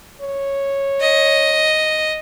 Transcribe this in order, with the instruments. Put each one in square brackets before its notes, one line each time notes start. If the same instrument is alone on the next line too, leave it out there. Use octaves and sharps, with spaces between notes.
[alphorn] C#5
[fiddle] D#5